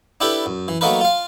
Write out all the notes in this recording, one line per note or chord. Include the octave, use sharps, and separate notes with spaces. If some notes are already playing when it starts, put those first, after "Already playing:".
D4 E4 G4 A4 B4
F#2
E3
F#3 A3 A#3 D#4 A#4 B4
F4 F5